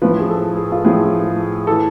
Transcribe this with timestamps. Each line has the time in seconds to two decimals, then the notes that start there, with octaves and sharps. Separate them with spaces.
0.02 A2 F3 B4
0.19 G#4
0.29 A4
0.56 G#4
0.72 F4
0.85 A2 F3 G#4
1.67 E3 A4